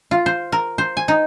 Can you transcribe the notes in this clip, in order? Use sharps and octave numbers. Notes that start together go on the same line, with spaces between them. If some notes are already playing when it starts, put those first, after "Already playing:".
F4
C5
A#4
C5
G#5
D#4